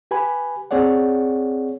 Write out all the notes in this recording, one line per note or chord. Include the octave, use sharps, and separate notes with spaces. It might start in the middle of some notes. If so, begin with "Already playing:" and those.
G4 B4 G#5 B5
C4 G#4 C#5 D5 F#5